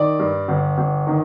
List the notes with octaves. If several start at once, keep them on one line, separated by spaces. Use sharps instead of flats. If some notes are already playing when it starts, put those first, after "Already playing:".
Already playing: D#3 D5
G2
G1
G1
D#3